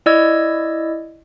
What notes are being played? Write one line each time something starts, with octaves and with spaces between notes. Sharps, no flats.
E4 D5 D#5 E6 G#6